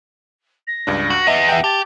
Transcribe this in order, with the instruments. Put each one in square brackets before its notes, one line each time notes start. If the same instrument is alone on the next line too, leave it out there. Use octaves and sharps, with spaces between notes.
[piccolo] A#6
[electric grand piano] C#2 G2 D4
[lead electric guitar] F#4
[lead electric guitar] E2 B3 [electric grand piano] D#5 E5
[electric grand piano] E5 F#5 G5
[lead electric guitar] G4 [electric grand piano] A5 [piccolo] A6